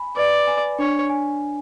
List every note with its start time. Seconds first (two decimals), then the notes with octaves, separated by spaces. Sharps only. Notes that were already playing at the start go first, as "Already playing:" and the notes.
Already playing: G#5 B5
0.16 B4 D5
0.47 G#5
0.79 D4 C#5
1.10 G#5